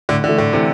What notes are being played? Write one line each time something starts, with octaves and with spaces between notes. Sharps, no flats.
A2 D3
D3 E3 A3
A2 D3
C3 E3 A3